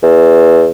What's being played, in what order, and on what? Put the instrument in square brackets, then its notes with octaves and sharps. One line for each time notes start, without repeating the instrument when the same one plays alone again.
[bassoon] E2